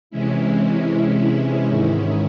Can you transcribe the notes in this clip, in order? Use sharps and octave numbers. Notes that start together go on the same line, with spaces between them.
C3 E3 G#3 C#4 E4
G#2 D#3 G#3 C#4 E4